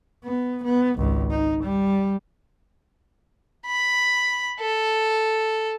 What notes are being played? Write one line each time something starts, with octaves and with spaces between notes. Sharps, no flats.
B3
B3
G#1 C#2
D#4
G3
B5
A4